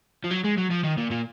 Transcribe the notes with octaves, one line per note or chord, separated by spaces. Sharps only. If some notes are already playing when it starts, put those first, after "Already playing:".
F3
F#3
G#3
F#3
F3
D#3
A#2
A#2